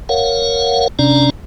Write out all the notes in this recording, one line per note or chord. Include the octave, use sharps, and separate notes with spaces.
A#4 C#5 F5 F#5
C3 C#4 D4 D5 A#5